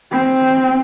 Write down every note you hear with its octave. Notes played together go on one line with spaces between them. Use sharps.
C4